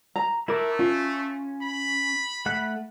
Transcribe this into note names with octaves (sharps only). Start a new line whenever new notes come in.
A#5
A3 E4 A#4 D6
C#4 F4
B5
A3 F#5 F#6